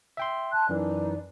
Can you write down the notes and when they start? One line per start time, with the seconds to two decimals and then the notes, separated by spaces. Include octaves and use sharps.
0.17 E5 G5 C6
0.53 A5 C6 F#6
0.69 F#2 E3 D#4 D5